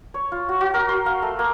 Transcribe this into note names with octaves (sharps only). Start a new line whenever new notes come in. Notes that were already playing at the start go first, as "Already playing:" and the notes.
C#5
F4
F#4
F#4
A#4
C6
F5
A3
A#3